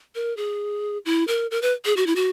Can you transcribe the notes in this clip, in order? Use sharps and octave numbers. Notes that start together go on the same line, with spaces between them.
A#4
G#4
E4
A#4
A#4
B4
G#4
F#4
E4
F#4